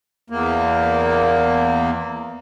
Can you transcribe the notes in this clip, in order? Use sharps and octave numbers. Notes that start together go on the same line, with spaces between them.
E2 A#3